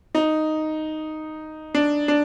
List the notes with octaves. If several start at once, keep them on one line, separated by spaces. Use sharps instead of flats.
D#4
D4
D4